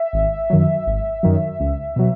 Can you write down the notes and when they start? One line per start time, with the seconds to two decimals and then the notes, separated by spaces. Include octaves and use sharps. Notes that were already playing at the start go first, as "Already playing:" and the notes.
Already playing: E5
0.13 G#1
0.50 F#2 D#3 F#3
0.87 G#1
1.23 F#2 D#3 F#3
1.60 C#2
1.96 B2 F#3